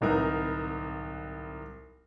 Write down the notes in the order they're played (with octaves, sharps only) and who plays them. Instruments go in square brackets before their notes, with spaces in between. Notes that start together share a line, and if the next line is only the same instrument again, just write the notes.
[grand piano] D1 C2 D#4 A#4 B4